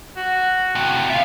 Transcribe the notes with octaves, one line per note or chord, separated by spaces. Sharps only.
F#4
A2 C3
F4 E5 F5